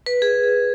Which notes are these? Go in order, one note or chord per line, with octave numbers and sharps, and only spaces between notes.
B4
G#4